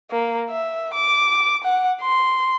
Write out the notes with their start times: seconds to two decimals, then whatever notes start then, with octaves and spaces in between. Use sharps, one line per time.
0.11 A#3
0.49 E5
0.93 D6
1.63 F#5
2.01 C6